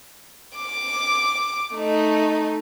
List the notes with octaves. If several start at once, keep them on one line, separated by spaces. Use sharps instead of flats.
D6
A3 D#4